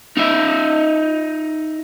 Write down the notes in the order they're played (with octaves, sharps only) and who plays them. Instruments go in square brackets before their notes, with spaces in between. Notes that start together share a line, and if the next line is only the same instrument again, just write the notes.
[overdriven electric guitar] D#4 E5